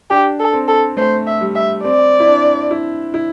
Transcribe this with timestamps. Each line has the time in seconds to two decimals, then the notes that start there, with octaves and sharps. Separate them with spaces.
0.10 D4 G4
0.40 A4
0.53 C4
0.68 A4
0.97 A3 C5
1.26 E5
1.41 G3
1.55 E5
1.84 C4 D5
2.20 E4
2.27 D4
2.71 E4
3.14 E4